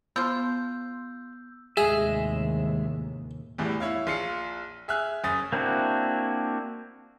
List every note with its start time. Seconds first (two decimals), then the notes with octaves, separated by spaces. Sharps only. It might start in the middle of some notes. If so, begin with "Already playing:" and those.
0.16 F3 B3 C5 E6 F6 G6
1.77 A1 D#2 C3 G#3 G#4 E5
3.58 E2 A2 E3 G3
3.80 E4 C#5 F5
4.07 A#1 F4 C7 C#7
4.88 G#4 E5 G#5 F6 F#6
5.24 F#1 C#4 D#6 A6
5.53 A#3 C4 D4 E4 F#4